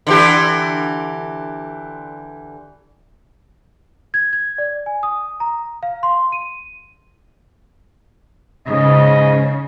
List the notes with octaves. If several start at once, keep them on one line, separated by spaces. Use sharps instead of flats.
D3 E3 G4
G#6
G#6
D5
G#5
D#6
A#5
F5
C6
D#7
G#2 C#3 D#5